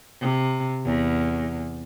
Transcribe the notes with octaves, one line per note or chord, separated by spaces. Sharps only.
C3
E2